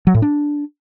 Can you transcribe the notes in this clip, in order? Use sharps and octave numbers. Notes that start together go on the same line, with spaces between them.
F#3
A2
D4